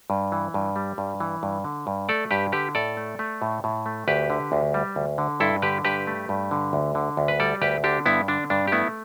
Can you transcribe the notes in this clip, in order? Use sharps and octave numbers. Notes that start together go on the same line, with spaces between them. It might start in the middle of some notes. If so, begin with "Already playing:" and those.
G2
E3
G2
G3
G2
E3
G2
D3
G2
A3 A4 D5
G2 G4 B4
D3 G4 B4
A2 A4 D5
A3
A3
A2
A2
A3
D2 G4 B4
D3
D2
G3
D2
D3
G2 E4 A4
D3 G4 B4
G2 G4 B4
A3
G2
D3
D2
D3
D2
B4
G3 A4 D5
D2 G4 B4
D3 D4 G4
G2 B3 E4
D3 D4
G2 D4
G4
A3 B3 E4